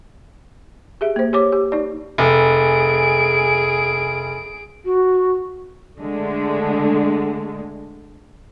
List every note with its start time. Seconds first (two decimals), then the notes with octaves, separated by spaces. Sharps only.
1.01 G4 G#4 E5
1.16 A#3 C5
1.33 G4 C#5 D6
1.52 G4
1.72 D#4 D5
2.18 F1 G#4 D7
4.85 F#4
5.97 D3 G#3 A3